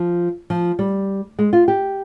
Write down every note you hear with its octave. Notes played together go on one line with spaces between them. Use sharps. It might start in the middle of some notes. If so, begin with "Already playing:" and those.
Already playing: F3
F3
G3
G#3
F4
G4